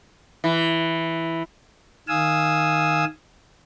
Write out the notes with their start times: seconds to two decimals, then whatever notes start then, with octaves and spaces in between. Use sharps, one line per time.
0.44 E3
2.08 D#3 F5 G#5 D#6 E6